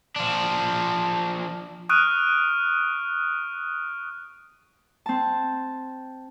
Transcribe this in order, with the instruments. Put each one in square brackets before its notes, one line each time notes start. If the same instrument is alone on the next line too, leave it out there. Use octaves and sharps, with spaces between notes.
[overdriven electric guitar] F3 D4
[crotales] C#6 D#6 F6 F#6 D7 D#7
[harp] C4 A5